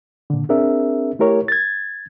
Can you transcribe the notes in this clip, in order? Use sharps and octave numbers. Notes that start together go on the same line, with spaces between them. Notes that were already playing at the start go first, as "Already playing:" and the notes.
A#2 D3
C4 D4 G#4 A#4 E5
A3 E4 G4 A#4 C#5
G#6 A6